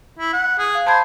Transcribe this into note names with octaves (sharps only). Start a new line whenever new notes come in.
E4
F#5
G#4
F5
C5 A5 B5 G#6